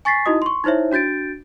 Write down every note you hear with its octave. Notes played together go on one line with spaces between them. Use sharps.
G#5 C#6 A6 B6 C7
D#4 E4 F#4 D#5 D#6
C6 C#6
D#4 E4 C5 C#5 E5
D4 F#4 G6 A6 D7